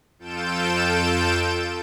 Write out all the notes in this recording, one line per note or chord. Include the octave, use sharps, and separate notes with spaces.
F2 F4 A4 G6 D7 E7